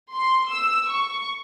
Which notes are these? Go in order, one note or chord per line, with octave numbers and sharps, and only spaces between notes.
C6
E6
C#6